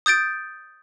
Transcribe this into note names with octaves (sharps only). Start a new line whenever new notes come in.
D#6 G6 A6 D7